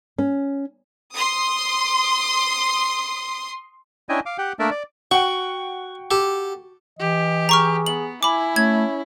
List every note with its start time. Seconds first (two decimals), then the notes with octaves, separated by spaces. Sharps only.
0.18 C#4
1.13 C6 D#6
4.09 C#4 D4 E4 D#5 G5 G#5
4.26 F5 D6
4.38 G4 F#5 G5
4.59 A3 A#3 D4 A#4 D5 E5
4.71 D5
5.11 F#4 F#5 G5 C#6
6.11 G4 A4
6.99 E3 G4 D#5
7.49 G#4 A#5 C#6 F6
7.86 B3 F#7
8.23 E4 G#5 B5 D6
8.56 A3 C#4 G#6